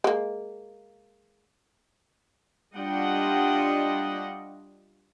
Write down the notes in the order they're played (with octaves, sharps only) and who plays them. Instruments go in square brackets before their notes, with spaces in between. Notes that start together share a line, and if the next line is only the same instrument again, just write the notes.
[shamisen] G#3 A#3
[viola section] G3 D4 F4 D#5 F#5 G5